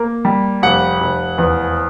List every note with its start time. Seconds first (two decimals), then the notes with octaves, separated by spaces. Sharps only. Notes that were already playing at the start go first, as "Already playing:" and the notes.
Already playing: A#3
0.25 G3
0.62 F1 F#5
1.00 F1
1.38 E2